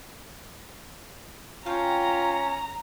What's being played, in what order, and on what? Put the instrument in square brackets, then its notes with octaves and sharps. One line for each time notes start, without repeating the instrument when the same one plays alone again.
[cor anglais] C#4 [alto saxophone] F4 [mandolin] G5 A5 [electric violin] A#5